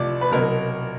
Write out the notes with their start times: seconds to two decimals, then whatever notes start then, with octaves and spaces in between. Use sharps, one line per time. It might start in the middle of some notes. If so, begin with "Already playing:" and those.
Already playing: C2 C3 F3 D5
0.21 B4
0.31 C2 B2 F#3 A#4